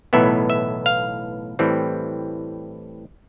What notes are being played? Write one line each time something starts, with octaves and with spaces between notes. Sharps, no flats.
B1 A2 E3 B3 E5
E5
F5
A2 E3 G3 C4